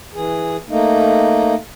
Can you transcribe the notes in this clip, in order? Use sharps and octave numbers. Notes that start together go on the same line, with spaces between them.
E3 G#4
A3 A#3 D#4